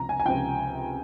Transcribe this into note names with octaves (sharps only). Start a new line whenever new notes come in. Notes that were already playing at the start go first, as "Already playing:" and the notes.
Already playing: C#2 C3 F3 A#5
G#5
G#5
C#2 C3 F3 G5